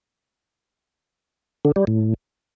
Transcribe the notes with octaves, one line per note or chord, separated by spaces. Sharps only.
D3
G3
A2